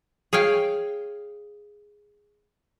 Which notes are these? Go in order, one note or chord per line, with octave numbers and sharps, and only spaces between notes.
G#4 C#5 F5 G5